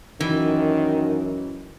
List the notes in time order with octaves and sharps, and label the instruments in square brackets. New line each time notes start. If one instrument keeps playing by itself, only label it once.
[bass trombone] F#2 [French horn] D#3 [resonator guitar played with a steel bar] E3